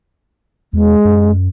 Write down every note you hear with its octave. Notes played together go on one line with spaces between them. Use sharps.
E2 G#3
F#2